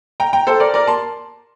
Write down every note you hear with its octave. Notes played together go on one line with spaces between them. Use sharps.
G5 A#5
G5 A#5
A4 C5
A#4 D5
A#4 D5
A5 C6